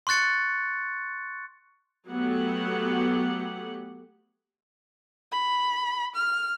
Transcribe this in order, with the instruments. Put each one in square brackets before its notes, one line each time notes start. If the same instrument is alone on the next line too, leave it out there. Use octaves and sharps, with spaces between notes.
[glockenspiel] C6 C#6 F#6 A6 C#7
[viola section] F#3 A3 B3 G4 F#5
[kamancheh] B5
F6